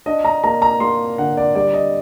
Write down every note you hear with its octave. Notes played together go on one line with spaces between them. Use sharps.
D4 D#5
A#5
A#3 A#5
A#5
A#3 C6
D3 F#5
D5
G3 D5
D#5